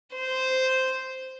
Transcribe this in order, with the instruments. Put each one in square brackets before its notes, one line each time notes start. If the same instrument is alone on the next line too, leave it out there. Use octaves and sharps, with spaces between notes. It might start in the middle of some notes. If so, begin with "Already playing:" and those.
[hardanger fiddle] C5